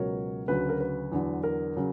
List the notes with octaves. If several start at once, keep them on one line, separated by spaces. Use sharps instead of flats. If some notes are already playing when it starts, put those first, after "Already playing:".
Already playing: C#2 B2 F#3 A#4 C#5
D2 C#3 F#3 B4
A#4
B4
E2 D3 F#3
A#4
C#3 F#3